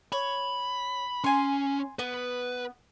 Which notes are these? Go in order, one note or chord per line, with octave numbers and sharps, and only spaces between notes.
C#5 B5
C#4 G#5 C6
B3 B4